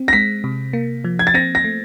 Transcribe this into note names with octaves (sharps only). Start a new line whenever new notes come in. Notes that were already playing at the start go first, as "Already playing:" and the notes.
Already playing: C4
A#6
G#3 B6
C3
A#3
F3
G#6
A6
C4 A#6
A#6
A3